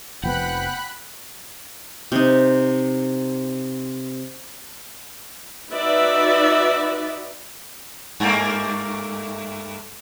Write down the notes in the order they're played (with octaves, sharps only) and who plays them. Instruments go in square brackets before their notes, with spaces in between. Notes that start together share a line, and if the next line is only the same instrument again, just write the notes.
[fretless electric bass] F1 F3 B3 [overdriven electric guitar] F#5 [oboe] G5 [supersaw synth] B5 F#6
[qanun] C3 D#4
[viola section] D#4 F#4 B4 D5 E5
[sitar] G2 A3 A#3